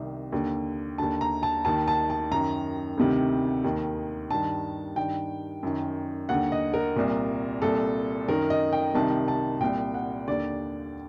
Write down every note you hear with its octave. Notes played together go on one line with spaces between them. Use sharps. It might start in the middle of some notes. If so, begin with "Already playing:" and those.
Already playing: C2 C3 D#3
D#2 D3
D#2 D3 A5
A#5
A5
D#2 D#3 A5
A5
A5
F#2 D#3 A#5
D2 C3 D#3
D#2 D#3
G2 D#3 A5
G2 D#3 G5
F#2 D#3
D#2 D3 F#5
D#5
A#4
C2 A#2
C2 A#2 A4
F#2 D#3 A#4
D#5
G5
C2 C3 D#3 A5
A5
C2 A#2 G5
F#5
D#2 D3 D5